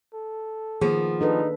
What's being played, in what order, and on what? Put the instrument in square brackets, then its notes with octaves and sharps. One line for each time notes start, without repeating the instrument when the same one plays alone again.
[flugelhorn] A4
[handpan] D#3 A#3 [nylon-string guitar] F3 B3 [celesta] G#4
[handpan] D4 A4 B4 [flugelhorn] D#4